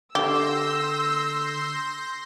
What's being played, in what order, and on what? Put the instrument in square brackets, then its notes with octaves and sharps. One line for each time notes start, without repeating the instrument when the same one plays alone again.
[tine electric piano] D3 [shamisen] G4 [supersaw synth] C6 G6 A#6 [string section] E6